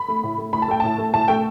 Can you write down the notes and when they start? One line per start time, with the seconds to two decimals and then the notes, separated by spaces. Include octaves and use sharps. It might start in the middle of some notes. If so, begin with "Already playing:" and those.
Already playing: B5
0.08 A3
0.23 A2
0.38 A3
0.53 A2 B5
0.62 A5
0.68 A3 G5
0.80 A2 A5
0.98 A3
1.13 A2 A5
1.28 A3 G5